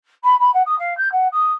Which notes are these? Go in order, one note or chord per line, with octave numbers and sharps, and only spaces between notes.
B5
B5
F#5
D#6
F5
G6
F#5
D#6